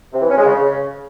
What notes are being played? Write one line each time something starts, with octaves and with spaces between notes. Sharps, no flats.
C3
E3
C#4
G#3
C#3